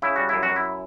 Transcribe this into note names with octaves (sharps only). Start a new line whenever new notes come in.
C#3 E4
G3 F#4
F#2 E4
F#4
F#2
E4